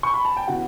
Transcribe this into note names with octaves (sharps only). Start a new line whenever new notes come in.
C#6
B5
A5
G5
C#3 E3 B3 F#4 F#5